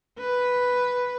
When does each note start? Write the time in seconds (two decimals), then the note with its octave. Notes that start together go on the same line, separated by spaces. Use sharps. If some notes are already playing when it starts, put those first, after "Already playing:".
0.19 B4